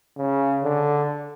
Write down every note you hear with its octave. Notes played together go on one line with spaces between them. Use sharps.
C#3
D3